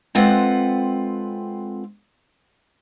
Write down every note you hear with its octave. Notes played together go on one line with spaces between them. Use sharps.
G#3 C4 F4 A4 B4 F#5